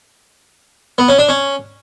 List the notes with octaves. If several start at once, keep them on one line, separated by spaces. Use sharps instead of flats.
B3
C#4
D4
C#4